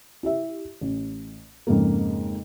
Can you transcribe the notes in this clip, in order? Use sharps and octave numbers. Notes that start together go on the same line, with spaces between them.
E4 G4 E5
A1
F2 G#2 C#3 G#3 A#3